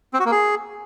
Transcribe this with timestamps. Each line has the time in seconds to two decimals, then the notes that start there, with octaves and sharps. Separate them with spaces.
0.14 C4
0.20 F#4
0.26 A#3
0.32 G#4